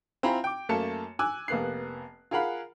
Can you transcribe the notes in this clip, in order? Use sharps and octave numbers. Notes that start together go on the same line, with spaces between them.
C4 E4 F4 G#5 A#5 B5
G5 D6
F#2 A3 A#3 A5 C#7 E7
G#5 D6 E6 F#6
F1 A#3 B3 F#6 C7
F4 G#4 A#4 F5 F#5 B5